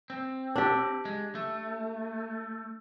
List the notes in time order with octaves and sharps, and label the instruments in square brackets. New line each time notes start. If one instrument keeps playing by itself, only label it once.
[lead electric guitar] C4
[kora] D4 G4
[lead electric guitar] G#3
A3